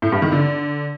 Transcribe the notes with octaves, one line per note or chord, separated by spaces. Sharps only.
A2
G2
D#3
D3